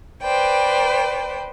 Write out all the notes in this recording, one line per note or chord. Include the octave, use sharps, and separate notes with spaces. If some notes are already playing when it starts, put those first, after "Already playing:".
B4 C5 D5 G5